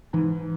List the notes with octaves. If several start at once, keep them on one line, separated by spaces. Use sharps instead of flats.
G#2 E3